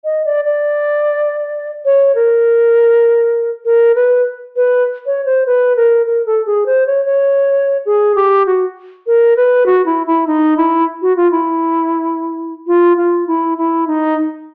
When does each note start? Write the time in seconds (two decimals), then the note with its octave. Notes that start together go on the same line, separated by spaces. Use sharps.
0.04 D#5
0.25 D5
0.45 D5
1.85 C#5
2.15 A#4
3.65 A#4
3.96 B4
4.56 B4
5.06 C#5
5.26 C5
5.46 B4
5.76 A#4
6.06 A#4
6.26 A4
6.46 G#4
6.66 C5
6.87 C#5
7.06 C#5
7.86 G#4
8.16 G4
8.46 F#4
9.07 A#4
9.37 B4
9.66 F#4
9.86 E4
10.07 E4
10.27 D#4
10.57 E4
11.02 F#4
11.17 F4
11.32 E4
12.67 F4
12.97 F4
13.27 E4
13.58 E4
13.87 D#4